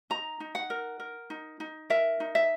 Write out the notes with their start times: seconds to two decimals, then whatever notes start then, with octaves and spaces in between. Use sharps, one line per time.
0.10 D#4 A#5
0.40 D#4
0.55 F#5
0.70 A#4
1.00 A#4
1.30 D#4
1.60 D#4
1.90 A#4 E5
2.20 D#4
2.35 E5